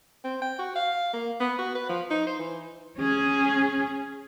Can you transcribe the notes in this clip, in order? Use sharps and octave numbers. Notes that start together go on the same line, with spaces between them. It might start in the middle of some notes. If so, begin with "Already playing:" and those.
C4
G5
F#4
F5
A#3
B3
F#4
B4
F3
D#4
C5
E3
C#4 G#4